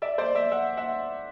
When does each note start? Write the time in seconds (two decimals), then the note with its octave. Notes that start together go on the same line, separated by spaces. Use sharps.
0.02 D5 E5
0.18 C5 D5
0.35 D5 E5
0.52 E5 F#5
0.77 E5 F#5